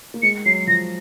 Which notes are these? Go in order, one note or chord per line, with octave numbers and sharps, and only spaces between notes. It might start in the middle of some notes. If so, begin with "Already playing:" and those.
A#3
G#3 C#7
F#3 C7
F3 A#6